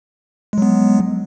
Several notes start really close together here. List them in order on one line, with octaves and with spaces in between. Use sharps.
G#3 F#3 B3